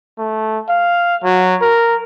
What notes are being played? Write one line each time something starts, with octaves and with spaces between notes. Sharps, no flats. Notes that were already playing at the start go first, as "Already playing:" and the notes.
A3
F5
F#3
A#4